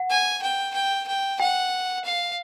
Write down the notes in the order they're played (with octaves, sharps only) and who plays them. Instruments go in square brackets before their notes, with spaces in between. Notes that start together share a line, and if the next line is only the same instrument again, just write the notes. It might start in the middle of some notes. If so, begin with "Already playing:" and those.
Already playing: [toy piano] F#5
[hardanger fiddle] G#5
G5
G5
G5
[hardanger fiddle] F#5 [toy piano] G5
[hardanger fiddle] F5